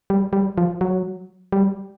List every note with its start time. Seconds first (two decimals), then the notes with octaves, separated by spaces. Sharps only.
0.10 G3
0.33 G3
0.58 F3
0.81 F#3
1.52 G3